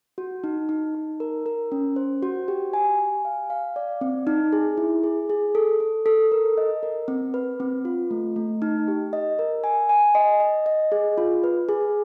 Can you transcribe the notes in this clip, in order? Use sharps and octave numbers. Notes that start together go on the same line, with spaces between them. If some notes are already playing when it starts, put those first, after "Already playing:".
F#4
D#4
D#4
D#4
A#4
A#4
C#4
C5
F#4
G4
G#5
G#5
F5
F5
D5
C4
D#4
G#4
E4
G#4
G#4
A4
A4
A4
A#4
D#5
A#4
C4
B4
C4
F4
A3
A3
D#4
G4
D#5
A#4
G#5
G#5
D#5
D#5
D#5
G#4
F4
B4
G#4